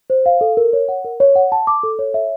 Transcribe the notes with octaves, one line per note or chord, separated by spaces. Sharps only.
C5
F5
A4
A#4
C#5
F#5
A#4
C#5
F#5
A5
D6
A4
C#5
E5